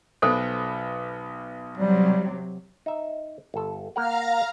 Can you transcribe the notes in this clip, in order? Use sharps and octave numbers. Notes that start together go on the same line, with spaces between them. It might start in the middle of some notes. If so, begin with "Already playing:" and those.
B1 B3 A4 C5
C3 F#3 G3
D#4 E5
G1 A4
A#3 A#4 F5 F#5 A#5 F6